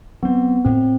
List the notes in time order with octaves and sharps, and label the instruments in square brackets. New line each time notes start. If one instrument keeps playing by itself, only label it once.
[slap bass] F#3 C4 [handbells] B3
[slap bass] A2 [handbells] C4